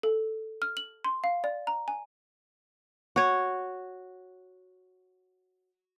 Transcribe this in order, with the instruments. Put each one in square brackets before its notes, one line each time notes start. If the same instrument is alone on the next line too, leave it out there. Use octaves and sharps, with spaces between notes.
[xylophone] A4
F6
F#7
C6
F5
D5
A#5
G#5
[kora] F#4 C#5